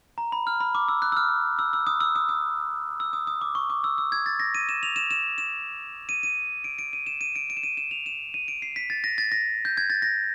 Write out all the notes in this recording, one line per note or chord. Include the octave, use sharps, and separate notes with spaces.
A#5
B5
F6
B5
D6
E6
F#6
E6
F6
E6
E6
D#6
E6
D#6
D#6
E6
D#6
D#6
D6
C#6
D6
E6
E6
G#6
A6
A#6
D#7
E7
F7
E7
E7
E7
D#7
D#7
D7
D7
D#7
E7
D#7
D7
D7
E7
D#7
E7
F7
E7
D#7
D7
C7
B6
A6
A#6
A6
A#6
G6
G#6
A6
A#6